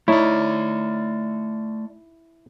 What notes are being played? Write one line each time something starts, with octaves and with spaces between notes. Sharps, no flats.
A3 D#4 E4 C#5 D5